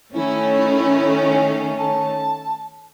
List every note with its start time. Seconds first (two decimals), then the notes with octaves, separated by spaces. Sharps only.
0.14 D#3 A3 C#4 E4
1.79 A5